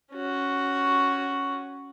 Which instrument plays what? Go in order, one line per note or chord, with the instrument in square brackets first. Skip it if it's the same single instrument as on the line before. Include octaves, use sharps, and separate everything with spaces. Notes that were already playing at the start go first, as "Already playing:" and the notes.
[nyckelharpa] C#4 F#4